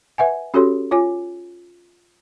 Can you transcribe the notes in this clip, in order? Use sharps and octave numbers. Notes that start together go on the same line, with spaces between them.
B4 E5 F#5 G#5
C#4 F#4 G4 A4 C#5 C6
F4 C#5 G#5 D6